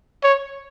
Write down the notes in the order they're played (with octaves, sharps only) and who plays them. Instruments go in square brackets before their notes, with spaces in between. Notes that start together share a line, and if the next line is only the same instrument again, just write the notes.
[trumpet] C#5